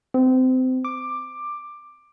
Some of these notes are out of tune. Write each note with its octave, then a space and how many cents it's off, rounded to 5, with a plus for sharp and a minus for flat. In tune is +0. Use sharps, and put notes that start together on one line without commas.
C4 -25
D6 +10